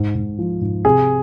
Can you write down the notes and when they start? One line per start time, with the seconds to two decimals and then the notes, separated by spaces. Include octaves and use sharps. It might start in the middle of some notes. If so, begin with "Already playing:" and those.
Already playing: G#2
0.15 G#2
0.39 F3
0.61 G#2
0.85 C3 G#4